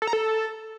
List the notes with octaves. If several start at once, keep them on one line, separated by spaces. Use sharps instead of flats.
A4
A#5
A4